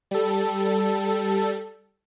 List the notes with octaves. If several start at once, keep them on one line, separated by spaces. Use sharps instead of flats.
G3 A4